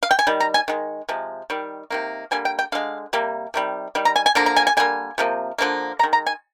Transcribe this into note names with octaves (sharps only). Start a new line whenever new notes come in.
F5
G5
G#5
D#3 G3
A#5
G#5
D#3 G#3
C3 F3 G#3
D#3 G3
C3 D#3 A#3
D3 G3 A#3 G#5
G5
G5
D3 G#3 F5
C3 G3 A#3
C3 D#3 G3
D#3 G3
A#5
G#5
G#5
D3 F3 A#3 A#5
A#5
G#5
G#5
D3 G3 A#3 G#5
C3 F3 A#3
D3 F3 A#3
D#3 G#3 A#5
A#5
G#5